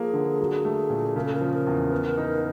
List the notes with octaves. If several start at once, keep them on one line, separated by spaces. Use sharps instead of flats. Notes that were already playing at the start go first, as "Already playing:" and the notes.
Already playing: F3 A#3 G#4
D3
F#3
A3
A#2
C#3 A#4
A4
A#4
F3
A#4
E2
B3
D#4